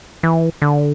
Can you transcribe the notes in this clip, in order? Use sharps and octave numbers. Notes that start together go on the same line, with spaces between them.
E3
D3